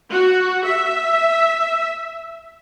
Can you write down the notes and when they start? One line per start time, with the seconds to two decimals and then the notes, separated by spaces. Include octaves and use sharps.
0.11 F#4
0.66 E5